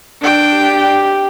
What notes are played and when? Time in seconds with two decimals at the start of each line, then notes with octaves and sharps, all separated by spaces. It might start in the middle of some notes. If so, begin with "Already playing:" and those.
0.21 D4 G5
0.55 G4